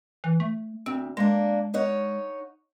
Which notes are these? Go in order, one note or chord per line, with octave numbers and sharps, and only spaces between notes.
E3
A3
D2 C4
G#3 A#3 D4
D#4 C#5 F#5